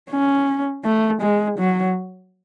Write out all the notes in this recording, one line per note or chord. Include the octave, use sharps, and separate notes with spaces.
C#4
A3
G#3
F#3